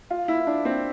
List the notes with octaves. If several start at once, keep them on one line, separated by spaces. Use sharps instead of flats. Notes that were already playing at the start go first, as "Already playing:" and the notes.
F4
E4
D4
C4